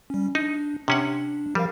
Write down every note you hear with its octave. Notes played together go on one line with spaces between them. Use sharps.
G3 C#4
D4 D#4
C3 C#4 D4 F#5
F3 G3 A#4 F5